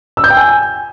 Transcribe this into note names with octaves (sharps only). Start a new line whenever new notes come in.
E6
G6
G5
G#5